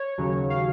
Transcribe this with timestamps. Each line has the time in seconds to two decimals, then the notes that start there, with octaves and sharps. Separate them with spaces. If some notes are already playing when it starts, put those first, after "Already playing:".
Already playing: C#5
0.18 D#2 C#3 F#3
0.50 F5